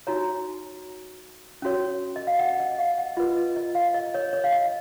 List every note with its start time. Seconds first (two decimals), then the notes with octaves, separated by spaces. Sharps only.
0.07 D#4 F#4 C#5 A#5
1.62 C#4 F#4 C#5
2.16 D#5
2.27 F5
2.39 F#5
2.60 D#5
2.75 D#5
2.79 F5
2.98 F#5
3.17 F4 B4 D#5
3.37 D#5
3.56 D#5
3.75 F5
3.94 D#5
4.14 C#5
4.33 C#5
4.44 F5
4.53 D#5